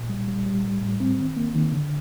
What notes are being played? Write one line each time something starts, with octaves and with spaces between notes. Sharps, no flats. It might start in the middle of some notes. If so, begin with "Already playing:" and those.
Already playing: A#2
G3
G3
G3
A2
A2
C4
D#3
A#3
D#3
D3